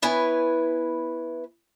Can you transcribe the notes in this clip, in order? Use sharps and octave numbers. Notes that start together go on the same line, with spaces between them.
B3 E4 B4 C#5 G#5